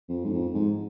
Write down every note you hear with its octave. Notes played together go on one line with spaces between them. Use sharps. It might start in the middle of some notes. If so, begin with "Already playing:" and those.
F2
G#2
F2
G#2